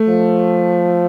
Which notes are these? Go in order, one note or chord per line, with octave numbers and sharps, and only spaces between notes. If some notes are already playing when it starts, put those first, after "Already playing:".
Already playing: A3
F3